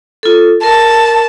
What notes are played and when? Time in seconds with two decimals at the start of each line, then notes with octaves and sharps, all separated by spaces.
0.23 F4 A4
0.63 A#4 A5